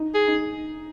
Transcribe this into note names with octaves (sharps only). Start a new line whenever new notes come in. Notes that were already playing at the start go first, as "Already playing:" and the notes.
Already playing: D#4
G#4
D#4